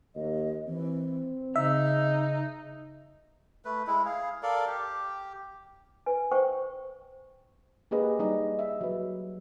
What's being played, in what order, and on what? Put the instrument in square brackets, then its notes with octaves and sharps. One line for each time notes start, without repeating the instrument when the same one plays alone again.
[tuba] D#2 [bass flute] D#5
[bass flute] E3 [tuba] C4
[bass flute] C#3 [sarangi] D#4 [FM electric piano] E5
[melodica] A3 B4
G#3 E4
G#4 F5
A4 A#4 D5 F5
G4
[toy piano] B4 G#5
C5 G5 C#6
[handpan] A#3 G4 G#4 B4 D#5
G3 D#4 D#5
E5
F#3 B4